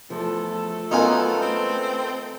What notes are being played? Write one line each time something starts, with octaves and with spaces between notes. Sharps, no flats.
E2 F3 A3 A4
F#2 B3 C#4 D#4 F4 A#4 G#5
C4